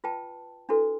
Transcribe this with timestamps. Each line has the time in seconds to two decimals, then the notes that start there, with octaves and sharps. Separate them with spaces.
0.04 F4 B4 G5 A5
0.69 D4 E4 F#4 A4 B4